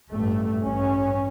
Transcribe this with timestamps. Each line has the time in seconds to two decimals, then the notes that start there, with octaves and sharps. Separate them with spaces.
0.12 A1 G2 A3
0.62 A1 G2 C#4